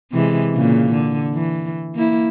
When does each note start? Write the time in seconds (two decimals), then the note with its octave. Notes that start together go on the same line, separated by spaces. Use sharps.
0.12 C3 E3 G#3
0.55 A#2 C#3
0.92 D3
1.34 E3
1.94 A#3 E4